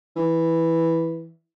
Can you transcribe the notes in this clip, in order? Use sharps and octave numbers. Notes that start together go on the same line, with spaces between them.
E3